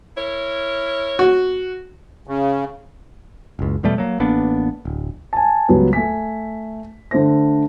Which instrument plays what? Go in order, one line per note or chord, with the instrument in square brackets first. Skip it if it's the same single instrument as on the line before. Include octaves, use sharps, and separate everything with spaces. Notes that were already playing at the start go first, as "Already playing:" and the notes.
[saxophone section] E4 A#4 C#5
[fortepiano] F#4
[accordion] C#3
[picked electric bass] F#1 C#2
E2 B2 G3 A3
F#3 A#3
A1 A#3 B3 D4
D1
[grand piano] G#5 A5
C#2 F#3 G3 B3
A3 G#5 B6
D3 A3 C5 A#6